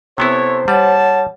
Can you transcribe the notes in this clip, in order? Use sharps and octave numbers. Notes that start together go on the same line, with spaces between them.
C3 B3 E4 A4 C5 C#5
G3 C#5 F#5 A5